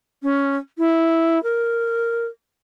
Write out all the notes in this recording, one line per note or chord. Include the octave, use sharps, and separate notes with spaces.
C#4
E4
A#4